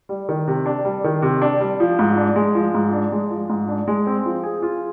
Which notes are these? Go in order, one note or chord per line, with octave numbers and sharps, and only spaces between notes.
G3
D#3
C3
D4
G3
D#3
C3
D4
G3
F3
G#2
D4
G#3
F3
G#2
D4
G#3
F3
G#2
D4
G#3
C4
F3
G#4
F4